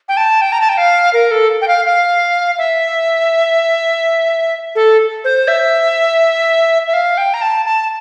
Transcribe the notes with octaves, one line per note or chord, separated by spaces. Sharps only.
G5
A5
G5
A#5
A5
G5
F5
A#4
A4
G5
F5
F5
E5
A4
C5
E5
E5
F5
G5
A#5
A5
A5